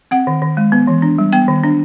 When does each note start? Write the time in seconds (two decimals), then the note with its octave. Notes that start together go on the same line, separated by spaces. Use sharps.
0.11 C4 F#5
0.27 D#3
0.42 D#3
0.57 G#3
0.72 B3
0.87 E3
1.02 D4
1.18 G3
1.33 B3 G5
1.48 D#3
1.63 D4